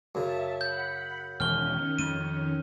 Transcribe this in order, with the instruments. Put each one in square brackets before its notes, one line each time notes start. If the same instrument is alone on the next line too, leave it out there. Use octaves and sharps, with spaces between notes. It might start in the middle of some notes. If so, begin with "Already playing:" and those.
[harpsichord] F#2 C#3 [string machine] E5 A5
[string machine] F#5 B5 [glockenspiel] G6
[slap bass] E1 [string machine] D#3 C#4 [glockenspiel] F6 G7
[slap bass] F2 [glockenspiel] D#7